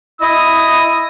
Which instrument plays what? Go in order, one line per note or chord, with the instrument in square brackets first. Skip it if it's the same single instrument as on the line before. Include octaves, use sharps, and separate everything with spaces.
[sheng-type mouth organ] E4 D#5 [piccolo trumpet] D#6